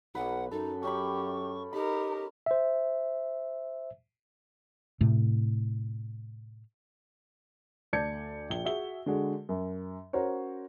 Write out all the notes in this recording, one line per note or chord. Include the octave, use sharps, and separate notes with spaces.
B1 B4 F#5
F#2 D#4 A4
C#4 G4 G5 B5 C#6
D#4 G4 A#4 B5
C5 E5
A2 C3 A3
D2 D5 A5 G6 G#6 C#7
A#1 G7
F#4 G#4 E5 G7
D3 G#3 F#4
F#2
C#4 F#4 A#4 C5 C#5